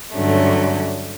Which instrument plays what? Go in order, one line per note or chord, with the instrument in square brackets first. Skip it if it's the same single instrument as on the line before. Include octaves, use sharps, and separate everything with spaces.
[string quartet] G2 D3 F#3 A3 C#4